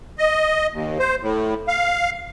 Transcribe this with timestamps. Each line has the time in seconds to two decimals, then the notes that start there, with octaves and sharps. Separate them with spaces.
0.18 D#5
0.72 D#2
0.99 C5
1.22 A2
1.68 F5